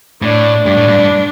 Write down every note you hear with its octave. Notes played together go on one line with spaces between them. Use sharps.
A2 D4
G2 D4
A2
G2
G2